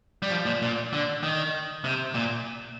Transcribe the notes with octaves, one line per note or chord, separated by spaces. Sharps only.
G3
F3
A#2
A#2
D3
D#3
C3
A#2